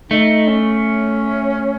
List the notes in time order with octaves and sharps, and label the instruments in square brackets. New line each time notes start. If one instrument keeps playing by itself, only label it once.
[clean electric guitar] A3 [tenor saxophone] D#4
[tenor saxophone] C#4